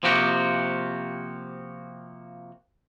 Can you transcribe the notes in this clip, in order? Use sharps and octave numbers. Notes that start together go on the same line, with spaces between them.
C3 F3 A#3 F#4 G4